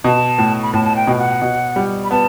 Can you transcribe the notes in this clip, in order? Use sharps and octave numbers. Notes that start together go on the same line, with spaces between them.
B2 A5
A2
B5
A2 A5
A5
G5
B2
F#5
B2
G3
B5
B3 A5